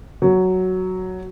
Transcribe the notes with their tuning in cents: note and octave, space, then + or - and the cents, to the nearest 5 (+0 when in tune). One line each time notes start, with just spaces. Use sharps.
F#3 +5